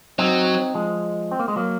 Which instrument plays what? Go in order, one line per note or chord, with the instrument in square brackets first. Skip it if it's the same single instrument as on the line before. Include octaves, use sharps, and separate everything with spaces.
[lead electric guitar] F#3 [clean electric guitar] C4 D#4
[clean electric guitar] F3 G#3
C4
A#3
G#3
F#3 A#3